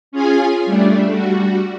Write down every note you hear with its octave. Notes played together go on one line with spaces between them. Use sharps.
C#4 F4 G#4 G#5
G3 A3 D4
G3 F#4